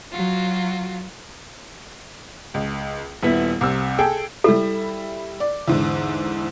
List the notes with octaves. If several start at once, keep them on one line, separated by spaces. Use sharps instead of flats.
F#3 F4 F#4
C#2
D#1 B3 E4
C2 C3 E6
G#4 A4 G5
G3 E4 A4
D5
E2 G#2 D3